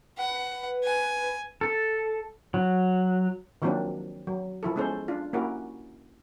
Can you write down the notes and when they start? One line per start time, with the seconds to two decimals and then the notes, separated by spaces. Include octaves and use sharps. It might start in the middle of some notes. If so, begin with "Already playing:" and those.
0.18 B4 F#5
0.84 G#5
1.61 A4
2.54 F#3
3.62 D#3 F3 F#3 A#3 C4 D4
4.27 F#3
4.63 F3 E4 A4
4.76 G#3 B3 C#4 A4 C5
5.08 D4 F4
5.33 A#3 C#4 E4 F#4 G4 A#4